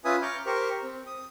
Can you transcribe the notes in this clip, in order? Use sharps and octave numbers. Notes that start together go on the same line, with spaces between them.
C#4 F4 B4 E5 G#5 D#6
A#5 C#6 D6 F6 G6
G4 A#4 C5 C#6
C4
D#6